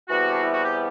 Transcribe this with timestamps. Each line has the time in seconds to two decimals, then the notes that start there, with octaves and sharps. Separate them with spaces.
0.09 E2 C3 E3 G3 B3 F#4
0.30 D4
0.41 E4
0.53 F#4
0.65 G4